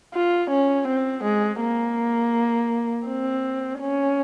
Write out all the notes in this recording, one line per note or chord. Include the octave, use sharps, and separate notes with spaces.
F4
C#4
C4
G#3
A#3
C4
C#4